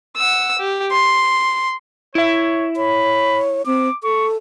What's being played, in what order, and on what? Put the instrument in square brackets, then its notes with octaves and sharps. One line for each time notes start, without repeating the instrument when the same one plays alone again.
[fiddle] F#5 E6
G4
C6
[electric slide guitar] E4 E5 [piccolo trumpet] C#5
[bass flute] C#5 [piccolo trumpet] B5
[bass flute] C4 [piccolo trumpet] D6
[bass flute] A4 [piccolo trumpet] C#6